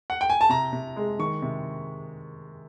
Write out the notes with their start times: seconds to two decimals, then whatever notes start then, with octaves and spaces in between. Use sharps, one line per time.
0.10 F#5
0.21 G5
0.30 G#5
0.41 A5
0.49 C3 A#5
0.73 C3
0.96 G#3
1.19 D#3 C#6
1.42 C3